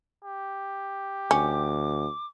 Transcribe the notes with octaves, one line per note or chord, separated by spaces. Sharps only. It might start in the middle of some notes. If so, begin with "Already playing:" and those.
G4
D2 C#4 D6